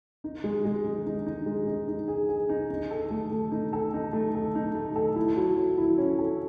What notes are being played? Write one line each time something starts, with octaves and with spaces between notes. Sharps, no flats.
D#4
G#3
G#3
D#4
D#4
D#4
G#3
D#4
D#4
G#4
G#4
D#4
D#4
A4
A3
A3
D#4
A4
D#4
A3
A4
D#4
A3
A4
E4
F#3
F#3
E4
C#4
A4